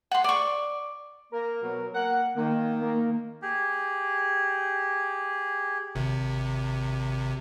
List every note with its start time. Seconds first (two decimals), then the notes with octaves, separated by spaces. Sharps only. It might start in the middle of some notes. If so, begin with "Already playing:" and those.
0.11 F#5 C6
0.24 D5 C#6
1.32 A#3 A#4
1.61 B2 F#3
1.94 A#3 A#4 F#5
2.35 D#3 A#3
2.81 A#3
3.42 G4 G#4
5.95 G#1 C3